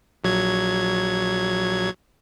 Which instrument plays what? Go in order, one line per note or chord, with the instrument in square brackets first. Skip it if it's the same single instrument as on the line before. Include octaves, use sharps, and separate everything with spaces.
[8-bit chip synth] A#1 F#3 G#6